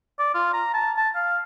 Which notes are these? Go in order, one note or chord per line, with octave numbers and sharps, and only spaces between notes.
D5
F4
A#5
A5
A5
F5